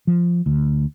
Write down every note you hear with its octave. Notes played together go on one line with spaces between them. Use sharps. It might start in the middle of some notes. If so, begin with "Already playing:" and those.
F3
D2